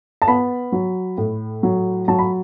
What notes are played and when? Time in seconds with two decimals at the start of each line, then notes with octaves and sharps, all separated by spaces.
0.22 A5
0.28 B3 B5
0.72 F#3
1.18 A2
1.63 F#3
2.08 F#3 A5
2.19 B5